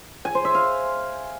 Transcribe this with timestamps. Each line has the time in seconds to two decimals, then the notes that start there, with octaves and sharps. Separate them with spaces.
0.25 G#5
0.35 C5
0.45 E5
0.55 F5